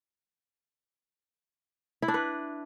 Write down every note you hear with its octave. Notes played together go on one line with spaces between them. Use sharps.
E4
D4
B4